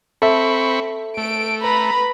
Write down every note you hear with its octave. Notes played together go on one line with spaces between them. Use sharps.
C4 A4 E5 B5 C#6
A3 D7
B4 A#5 B5